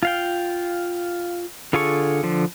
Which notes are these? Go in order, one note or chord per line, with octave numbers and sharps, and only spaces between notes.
F4 F5 G5
D3 F4 G#4 A4 C#6
D3 F3